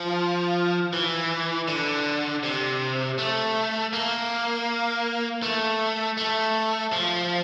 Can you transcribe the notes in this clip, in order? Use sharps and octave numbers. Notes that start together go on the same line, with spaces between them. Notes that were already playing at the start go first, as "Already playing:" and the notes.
Already playing: F3
E3
D3
C3
A3
A#3
A3
A3
F3